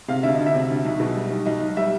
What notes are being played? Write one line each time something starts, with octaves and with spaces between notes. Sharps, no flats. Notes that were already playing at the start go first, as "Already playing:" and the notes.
C3 F5
D2 E5
D2 D#5
E5
C3
D2
B1
B2
G3
B1
B1 D#5
B1
G3 E5